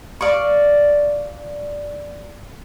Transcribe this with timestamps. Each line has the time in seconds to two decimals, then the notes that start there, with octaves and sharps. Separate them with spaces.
0.21 D5 F5 C#6